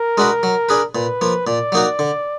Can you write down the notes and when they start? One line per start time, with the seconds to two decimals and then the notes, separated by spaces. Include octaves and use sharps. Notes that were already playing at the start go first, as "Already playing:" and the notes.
Already playing: A#4
0.18 G#3 D4 F#4 B4
0.43 F#3
0.69 D4 G#4 B4
0.95 A#2 B4
1.21 F3 A#3
1.47 A#2 D5
1.72 F#3 A#3 D#4 F#4
1.99 D3